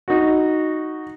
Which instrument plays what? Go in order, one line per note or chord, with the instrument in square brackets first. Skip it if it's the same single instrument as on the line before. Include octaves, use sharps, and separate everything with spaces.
[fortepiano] D#4 F#4